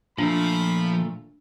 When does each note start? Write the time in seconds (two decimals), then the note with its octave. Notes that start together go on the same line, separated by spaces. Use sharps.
0.18 A#2 F3 A3 D4 B5